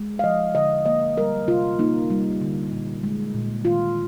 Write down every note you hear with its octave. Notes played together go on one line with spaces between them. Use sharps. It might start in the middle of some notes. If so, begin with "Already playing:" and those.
Already playing: G#3
F5
F3 D#5
D3 D#5
A#3 D#5
G3 A#4
C3 F4
A#3 D#4
G3
D3
A#2
G#3
A#2
D#3 F4